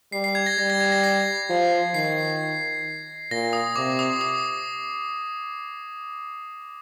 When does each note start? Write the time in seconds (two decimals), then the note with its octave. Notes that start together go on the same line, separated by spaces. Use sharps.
0.12 G3 C7
0.24 C7
0.35 G#6
0.46 A#6
0.58 G3 A#6
0.70 A#6
0.80 G#6
0.92 A#6
1.04 C7
1.50 F3
1.94 D#3 C7
3.31 A#2 A#6
3.53 D#6
3.76 C3 D6
3.99 D#6
4.21 D#6